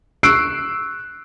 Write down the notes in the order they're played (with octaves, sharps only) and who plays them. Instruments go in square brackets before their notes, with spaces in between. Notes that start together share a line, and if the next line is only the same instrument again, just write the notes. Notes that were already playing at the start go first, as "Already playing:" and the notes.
[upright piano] C#6 E6 F#6 C7 D7